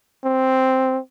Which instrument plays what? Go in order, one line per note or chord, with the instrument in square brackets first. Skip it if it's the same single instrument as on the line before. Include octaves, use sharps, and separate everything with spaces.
[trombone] C4